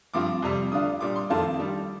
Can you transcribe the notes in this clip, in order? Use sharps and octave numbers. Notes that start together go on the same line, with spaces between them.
G2 F3 C4 F4 D6
F2 C3 G3
D3 A3 D4 F4 D#6
A#2 G3 D4 D6
C6
F2 D#3 A3 C4 F4 A5
D#3 G3 D4